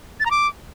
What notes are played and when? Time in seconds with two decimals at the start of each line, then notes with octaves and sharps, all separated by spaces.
0.20 A6
0.25 A#5
0.31 D6